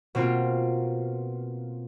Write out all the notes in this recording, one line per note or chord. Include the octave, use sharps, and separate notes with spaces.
B2 A#3 C4 F4